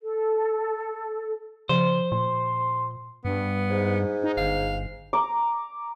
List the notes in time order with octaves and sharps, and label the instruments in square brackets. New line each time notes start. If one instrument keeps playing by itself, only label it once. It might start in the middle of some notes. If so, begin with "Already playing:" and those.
[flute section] A4
[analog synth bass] C#3 [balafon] F3 [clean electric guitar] C5
[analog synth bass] A#2 [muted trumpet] C6
[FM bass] G2 [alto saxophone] B3
[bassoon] G#2
[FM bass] D#4
[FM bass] G1 [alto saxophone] F5
[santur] A#5 D6